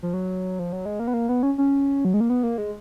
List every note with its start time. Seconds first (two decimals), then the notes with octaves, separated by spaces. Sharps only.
0.03 F3
0.14 F#3
0.59 F3
0.73 F#3
0.85 G#3
1.00 A#3
1.08 B3
1.14 A#3
1.29 B3
1.43 C#4
1.58 C#4
2.05 F#3
2.14 G#3
2.21 A#3
2.30 B3
2.43 A#3
2.58 G#3